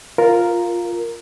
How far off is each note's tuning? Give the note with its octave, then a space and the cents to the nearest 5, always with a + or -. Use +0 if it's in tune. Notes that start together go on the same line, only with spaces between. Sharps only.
F4 +0 A#4 +0